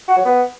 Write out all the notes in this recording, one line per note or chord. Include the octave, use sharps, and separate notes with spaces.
F#4
F#3
B3